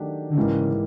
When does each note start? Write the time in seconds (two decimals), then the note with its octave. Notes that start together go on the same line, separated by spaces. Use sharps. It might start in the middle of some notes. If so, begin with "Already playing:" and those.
Already playing: D#3 F#3 A3 D4 G4
0.30 D3
0.37 G#2 C#3 E3 G3 A#3